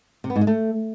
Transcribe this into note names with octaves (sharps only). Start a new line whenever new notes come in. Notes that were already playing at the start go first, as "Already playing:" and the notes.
C3
B3
G#2
G#3
A3